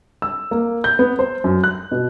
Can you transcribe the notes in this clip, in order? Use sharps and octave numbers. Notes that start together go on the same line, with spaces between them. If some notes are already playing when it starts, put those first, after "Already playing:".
E6
A#3
G6
B3
C5
F#2
F#6
B2